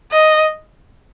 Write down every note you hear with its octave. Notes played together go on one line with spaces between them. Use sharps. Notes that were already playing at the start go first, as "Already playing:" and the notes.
D#5